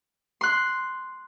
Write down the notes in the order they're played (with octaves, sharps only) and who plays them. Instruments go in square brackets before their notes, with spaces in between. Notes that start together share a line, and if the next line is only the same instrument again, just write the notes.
[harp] C6 F#6